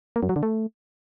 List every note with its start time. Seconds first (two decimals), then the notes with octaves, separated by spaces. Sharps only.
0.16 A#3
0.23 F#2
0.29 F#3
0.36 D3
0.43 A3